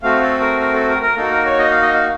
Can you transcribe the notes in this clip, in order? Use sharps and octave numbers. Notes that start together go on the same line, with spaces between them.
A3 C4 F#4 F5
A4
A#4
A#4
A4
A#4
A#4
A#3 D#4 F#4 A4
A#4
C#5
D#5
F5
D#5
F5